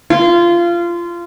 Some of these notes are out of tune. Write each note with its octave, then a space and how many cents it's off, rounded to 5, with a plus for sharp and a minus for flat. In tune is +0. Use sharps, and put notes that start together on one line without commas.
F4 -20